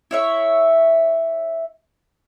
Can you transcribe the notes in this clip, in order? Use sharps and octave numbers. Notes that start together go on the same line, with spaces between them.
E4 C#5 E5